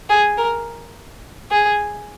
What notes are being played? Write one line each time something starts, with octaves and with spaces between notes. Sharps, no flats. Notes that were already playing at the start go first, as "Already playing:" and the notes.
G#4
A#4
G#4